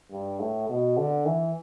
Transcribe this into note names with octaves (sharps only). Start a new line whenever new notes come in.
G2
A2
B2
D3
E3